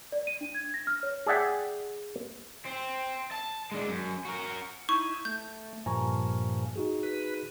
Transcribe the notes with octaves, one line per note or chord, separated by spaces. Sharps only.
D5
D#7
D4
G#6
A#6
F6
C#5
G#4 D5 E5 F#5 G5
C4
A5
G#3 D4
F#2
F#4 A#4
D#4 E4 C#6
A3 G6
G2 A#2 F3 G#5 A#5 C#6
D#4 F#4 G#4
B4